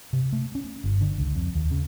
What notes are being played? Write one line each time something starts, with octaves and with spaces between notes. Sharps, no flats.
C3
A3
C#4
G1
D3
C#2
F2
D#2
C#3